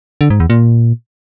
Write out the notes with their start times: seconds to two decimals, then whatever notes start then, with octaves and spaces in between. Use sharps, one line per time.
0.21 D3
0.30 G#2
0.40 E2
0.50 A#2